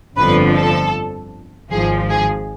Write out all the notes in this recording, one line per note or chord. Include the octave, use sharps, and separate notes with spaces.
G1 F2 D3 F3 B4
A4
G#1 G#2 F3 G#4
G#4